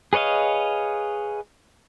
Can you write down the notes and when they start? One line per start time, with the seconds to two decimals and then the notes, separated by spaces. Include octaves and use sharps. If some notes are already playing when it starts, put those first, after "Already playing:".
0.13 G#4 B4 C#5 D#5 F5